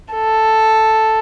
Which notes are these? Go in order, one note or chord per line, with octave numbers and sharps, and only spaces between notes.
A4